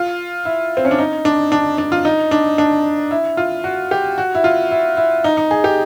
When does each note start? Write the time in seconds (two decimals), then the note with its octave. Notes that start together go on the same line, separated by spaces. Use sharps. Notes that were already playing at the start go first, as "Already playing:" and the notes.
Already playing: F4
0.45 E4
0.77 C4
0.85 C#4
0.91 D4
0.98 D#4
1.25 D4
1.52 D4
1.78 D4
1.92 F4
2.05 D#4
2.31 D4
2.58 D4
3.11 E4
3.37 F4
3.64 F#4
3.91 G4
4.18 F#4
4.35 E4
4.44 F4
4.71 E4
4.97 E4
5.24 D#4
5.37 D#4
5.51 G#4
5.64 G4